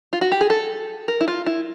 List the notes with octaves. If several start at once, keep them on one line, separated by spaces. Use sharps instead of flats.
F4
F#4
G4
G#4
A4
A#4
E4
F4
E4